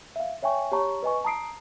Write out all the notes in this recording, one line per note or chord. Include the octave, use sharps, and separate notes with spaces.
E5 F5
C#5 E5 G5 G#5 C#6
G4 C#5 A5 A#5 C#6
B4 D#5 G#5 C#6
A5 A#5 D#6 C7 D7